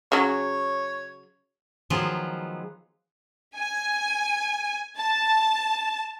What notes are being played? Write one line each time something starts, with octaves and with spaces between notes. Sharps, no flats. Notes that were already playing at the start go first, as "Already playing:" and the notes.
C#3 F#3 C#5
D#3 F3 F#3 G#3 B3 F4
G#5
A5